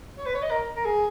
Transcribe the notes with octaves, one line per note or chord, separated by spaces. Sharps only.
C#5
B4
C#5
D#5
A#4
A#4
G#4